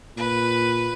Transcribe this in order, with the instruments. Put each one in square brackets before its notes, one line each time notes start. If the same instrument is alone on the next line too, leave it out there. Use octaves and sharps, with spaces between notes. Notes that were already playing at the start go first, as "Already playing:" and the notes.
[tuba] A#2 [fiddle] B4